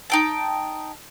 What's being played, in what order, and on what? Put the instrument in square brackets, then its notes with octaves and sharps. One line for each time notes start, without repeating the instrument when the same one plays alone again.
[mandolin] D#4 G5 A5